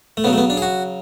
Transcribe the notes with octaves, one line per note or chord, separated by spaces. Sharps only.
A3
C#3 F#3 B3
A3
B3
D4
G#4
F#4